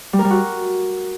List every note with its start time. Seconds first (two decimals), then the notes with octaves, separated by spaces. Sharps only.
0.13 G3
0.19 A#4
0.25 G3
0.30 F#4